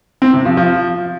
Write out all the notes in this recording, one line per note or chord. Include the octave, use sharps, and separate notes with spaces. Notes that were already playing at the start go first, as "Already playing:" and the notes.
C4
C3
F3
F3